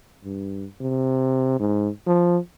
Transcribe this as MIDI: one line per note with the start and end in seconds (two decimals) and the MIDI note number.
0.25 0.66 43
0.81 1.58 48
1.60 1.89 44
2.06 2.38 53